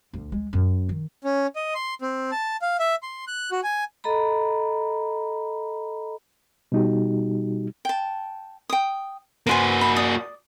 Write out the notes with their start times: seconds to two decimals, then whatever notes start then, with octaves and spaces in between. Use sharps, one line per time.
0.13 D2
0.32 G#3
0.53 F#2
0.89 D#3
1.24 C#4
1.56 D#5
1.75 C6
2.02 C4
2.31 A5
2.62 F5
2.80 E5
3.03 C6
3.27 F#6
3.52 F#4
3.63 G#5
4.04 A4 D#5 A#5 B5
6.72 B2 G3 D#4 F#4 G4
7.85 G5 A5
8.70 G5 D#6
9.47 A#3 F#4 B4 C5 G#5
9.81 B5
9.96 D5 D#6